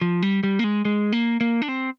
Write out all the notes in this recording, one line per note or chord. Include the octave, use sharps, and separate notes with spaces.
F3
G3
G3
A#3
G#3
G#3
A#3
A#3
D4
C4